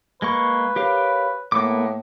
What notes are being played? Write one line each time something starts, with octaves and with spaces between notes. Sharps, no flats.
G#3 A#3 B4 C#6
G4 A#4 C#5 F5
A2 A#3 B3 D6